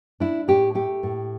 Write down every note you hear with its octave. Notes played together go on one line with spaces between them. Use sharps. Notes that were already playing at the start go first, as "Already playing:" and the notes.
D4 E4
A2 G4
A3 G4
A2